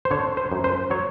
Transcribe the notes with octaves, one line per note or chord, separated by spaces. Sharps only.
C5
D3 C#5
C5
F#2
C5
F#3 C#5